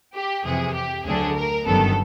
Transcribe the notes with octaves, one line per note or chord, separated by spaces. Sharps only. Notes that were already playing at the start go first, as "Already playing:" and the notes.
G4
F2 C3 E3 G#4
G4
D2 D3 F#3 A3 D4 G#4
A#4
G1 F#2 D#3 F#3 B3 A4